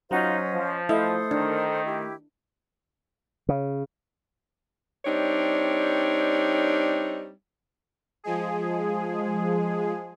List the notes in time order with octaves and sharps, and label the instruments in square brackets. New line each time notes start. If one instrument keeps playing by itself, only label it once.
[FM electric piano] F#3 F#5 [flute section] C#4 C5 D#5 [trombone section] D#4 F4
[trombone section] F3
[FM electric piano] A3 D#5 [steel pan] E4 [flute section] A4 C5 D#6
[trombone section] D#3 [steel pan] D4
[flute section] E4 G4
[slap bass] C#3
[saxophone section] G3 C4 D4 D#4 C#5
[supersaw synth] F3 G#3 G#4